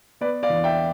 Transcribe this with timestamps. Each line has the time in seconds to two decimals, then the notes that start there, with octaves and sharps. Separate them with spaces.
0.21 B3 B4 D5
0.43 D5 F5
0.50 E2
0.64 E5 G5